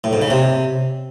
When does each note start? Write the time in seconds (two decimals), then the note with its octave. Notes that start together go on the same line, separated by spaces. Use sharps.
0.04 A2
0.13 G#2
0.22 C#3
0.30 C3